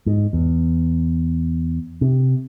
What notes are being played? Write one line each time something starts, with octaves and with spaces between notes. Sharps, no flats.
G#2
E2
C3